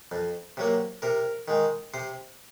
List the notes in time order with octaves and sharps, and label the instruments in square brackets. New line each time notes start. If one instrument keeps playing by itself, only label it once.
[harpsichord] F2
C3 F#3 A#3
C3 A#4
D#3 G#3
C3 C5